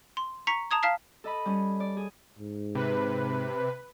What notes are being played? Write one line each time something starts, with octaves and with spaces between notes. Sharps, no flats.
C6
A#5 C#6 B6 C#7
A5 A#5 D#6 G#6
F5 A5 F6 B6 C7
A4 D#5 B5
G3 C#4
D5
G#4
G#2
C3 B4